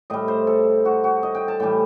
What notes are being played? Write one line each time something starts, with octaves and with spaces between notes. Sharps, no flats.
A2 G3 D#5
C5
A4
F#4
F#4
D#5
G5
A5
A2 E3 G3 G5